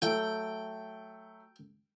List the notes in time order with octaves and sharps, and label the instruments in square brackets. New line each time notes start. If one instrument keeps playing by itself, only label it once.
[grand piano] F#3 A3 [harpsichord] G5